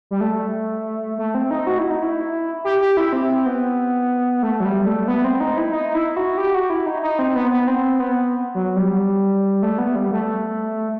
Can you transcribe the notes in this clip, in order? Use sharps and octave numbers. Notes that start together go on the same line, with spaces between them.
G3
A3
A3
C4
D#4
F#4
E4
D#4
E4
G4
G4
E4
C4
B3
A3
F#3
G3
A3
B3
C4
D#4
E4
D#4
E4
F#4
G4
F#4
E4
D#4
D#4
C4
B3
B3
C4
B3
F#3
G3
A3
B3
G3
A3